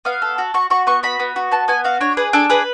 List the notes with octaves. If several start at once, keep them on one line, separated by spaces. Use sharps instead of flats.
B3 F5
A4
F#4
F#4 C#6
F#4 C#6
B3 C#6
F#4 B5
B3
F#4
B3 A5
B3 G#5
F#4 F5
D4 C#5
G#4 B4
D4 A4
G#4 B4